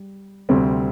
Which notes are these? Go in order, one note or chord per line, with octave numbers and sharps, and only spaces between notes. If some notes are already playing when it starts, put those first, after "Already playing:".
Already playing: G3
D2 C3 G3 C4